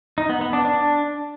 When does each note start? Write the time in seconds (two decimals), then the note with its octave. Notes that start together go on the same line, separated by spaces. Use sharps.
0.18 D#4
0.29 B3
0.41 B3
0.53 D4
0.65 D4